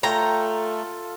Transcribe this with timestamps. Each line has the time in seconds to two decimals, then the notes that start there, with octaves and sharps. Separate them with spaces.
0.03 A3 F4 A4 C#5 G5 A#5